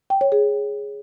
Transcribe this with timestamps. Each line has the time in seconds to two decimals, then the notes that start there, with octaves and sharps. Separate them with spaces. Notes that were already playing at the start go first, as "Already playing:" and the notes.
0.10 G5
0.21 C#5
0.32 G#4